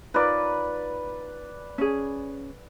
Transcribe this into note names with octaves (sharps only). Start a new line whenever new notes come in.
D#4 F4 A#4 B4 D5
C#4 G#4